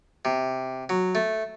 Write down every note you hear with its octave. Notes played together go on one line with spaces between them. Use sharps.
C3
F#3
A3